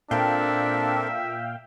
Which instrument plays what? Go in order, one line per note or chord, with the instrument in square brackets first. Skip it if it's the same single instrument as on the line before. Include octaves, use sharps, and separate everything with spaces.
[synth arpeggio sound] A#2 F5 G5 [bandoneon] C4 A4 A#4 [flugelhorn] D4 [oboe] E5